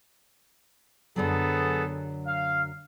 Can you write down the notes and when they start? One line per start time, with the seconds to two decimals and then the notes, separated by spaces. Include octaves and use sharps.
1.16 F#2 D3 F#3 B3 G#4 A4
2.27 F5